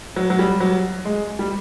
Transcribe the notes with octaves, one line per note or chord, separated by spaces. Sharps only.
F#3
F#3
G3
F#3
G#3
G3